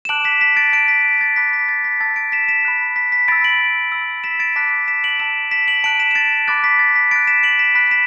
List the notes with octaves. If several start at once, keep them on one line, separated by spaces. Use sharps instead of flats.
E7
A5 D6 F#6 D7 F#7
B6 E7
B6 E7
A6 D7
A5 F#6 A6 D7
B6
B6
A6
B5 D6 F#6 B6
B6
A6
B6
A5 E6 A6
A6 D7
B6 E7
B6 E7
B5 F#6
B6
B6
B5 E6 A6 D7
D7 F#7
B5 E6
B6 E7
A6 D7
A5 D6 F#6 B6
B6 E7
D7 F#7
A5 E6 B6 E7
B6 E7
D7 F#7
A5 F#6 D7 F#7
B6 E7
E7
A6 D7
B5 D6 F#6 A6
B6
A6
B6
B5 F#6 A6 D7
B6 E7
D7 F#7
B6 E7
B5 F#6 B6
B6 E7